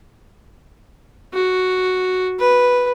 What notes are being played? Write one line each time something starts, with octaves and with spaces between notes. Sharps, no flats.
F#4
B4